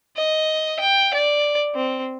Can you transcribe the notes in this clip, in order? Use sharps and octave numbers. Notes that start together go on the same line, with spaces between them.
D#5
G5
D5
C4